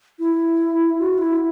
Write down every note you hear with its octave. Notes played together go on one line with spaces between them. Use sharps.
E4
F#4
E4